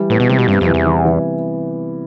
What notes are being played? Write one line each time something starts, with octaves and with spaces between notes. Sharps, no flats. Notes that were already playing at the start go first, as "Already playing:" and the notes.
Already playing: E3 G3
A2 B3
B2
C3 G3
B2
G2 C3
F2
E3
E2
E3
E3